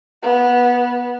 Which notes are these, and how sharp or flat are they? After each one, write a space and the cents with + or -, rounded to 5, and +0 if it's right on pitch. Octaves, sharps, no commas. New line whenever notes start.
B3 -15